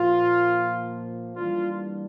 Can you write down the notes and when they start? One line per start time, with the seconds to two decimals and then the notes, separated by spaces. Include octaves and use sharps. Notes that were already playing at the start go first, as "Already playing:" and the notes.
Already playing: A#2 F3 A#3 F4
1.36 E3 G3 A#3 D4 F4